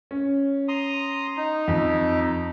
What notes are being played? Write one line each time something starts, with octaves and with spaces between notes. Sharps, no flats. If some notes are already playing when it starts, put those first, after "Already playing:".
C#4
A#5 C6 D#6
D#4
F2